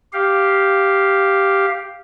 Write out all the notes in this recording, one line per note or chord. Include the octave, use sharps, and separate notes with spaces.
G4 F5